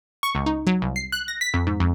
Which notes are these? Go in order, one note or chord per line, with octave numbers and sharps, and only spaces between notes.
C#6
C#2
D#4
F#3
C2
C7
F#6
A#6
B6
F2
G#2
F2